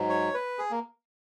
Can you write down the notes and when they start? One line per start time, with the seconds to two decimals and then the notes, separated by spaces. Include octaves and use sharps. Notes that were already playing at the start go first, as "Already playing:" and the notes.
Already playing: G#2 F#3
0.09 C#5
0.34 B4
0.59 G#4
0.71 A#3